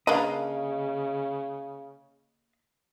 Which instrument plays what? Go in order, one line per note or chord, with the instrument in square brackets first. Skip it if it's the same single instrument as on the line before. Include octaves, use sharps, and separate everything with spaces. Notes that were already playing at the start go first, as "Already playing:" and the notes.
[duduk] C#3 [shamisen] A#3 D4 B4 [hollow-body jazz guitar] D#5 F5